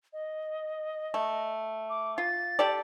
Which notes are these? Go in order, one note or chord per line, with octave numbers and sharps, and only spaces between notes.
D#5
A3
D6
F4 A6
G4 A4 D5